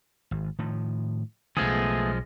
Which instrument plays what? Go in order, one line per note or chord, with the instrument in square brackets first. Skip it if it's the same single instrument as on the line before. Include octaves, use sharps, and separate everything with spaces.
[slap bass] G#1
A2 D#3 F3
[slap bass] B1 C#3 [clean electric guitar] F3 G#3 [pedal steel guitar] A3 B3 G#4